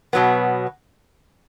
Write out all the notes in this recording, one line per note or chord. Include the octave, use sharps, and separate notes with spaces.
B2 F#3 B3